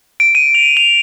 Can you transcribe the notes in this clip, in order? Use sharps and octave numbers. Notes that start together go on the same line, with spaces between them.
D7
D#7
F7
F7